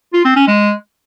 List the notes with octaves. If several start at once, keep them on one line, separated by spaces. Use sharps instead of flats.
F4
C4
C#4
G#3